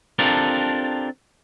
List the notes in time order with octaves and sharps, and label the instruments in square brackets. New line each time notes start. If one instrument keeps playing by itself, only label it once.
[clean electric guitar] C4 D4 F4 G4 A4 A#4